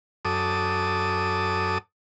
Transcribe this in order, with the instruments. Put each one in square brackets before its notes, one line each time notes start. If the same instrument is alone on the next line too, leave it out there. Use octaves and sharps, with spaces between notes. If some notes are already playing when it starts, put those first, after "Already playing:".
[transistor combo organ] F#2 A4 D6 D#6